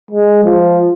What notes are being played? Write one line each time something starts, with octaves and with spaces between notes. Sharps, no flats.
G#3
F3